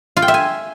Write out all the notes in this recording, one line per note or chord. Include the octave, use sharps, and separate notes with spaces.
F4
G5
E5
G#5